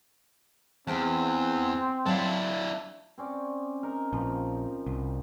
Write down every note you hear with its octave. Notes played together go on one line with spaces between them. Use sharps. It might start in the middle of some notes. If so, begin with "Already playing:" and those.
E2 C4 C5 G5 A5
F#3 D4 E4 F5
C4 C#4 D5
D#4 A#4
A#1 F3
C2